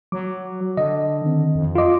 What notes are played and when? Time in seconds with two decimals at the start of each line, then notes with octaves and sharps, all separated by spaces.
0.12 F#3 D6
0.77 D3 D#5
1.22 D#3 C4
1.55 F2
1.75 F4 D#5 C6 D6